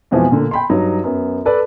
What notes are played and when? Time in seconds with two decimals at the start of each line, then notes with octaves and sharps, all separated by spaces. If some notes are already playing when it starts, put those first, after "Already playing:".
0.11 F2 B2 E3 F3 G#3
0.31 A#2 D3
0.51 G5 B5 C6
0.70 G2 F#3 D#4
1.04 F#2 B3
1.45 A4 B4 D5